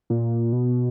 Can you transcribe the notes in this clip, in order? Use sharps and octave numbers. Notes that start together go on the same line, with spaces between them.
A#2
B2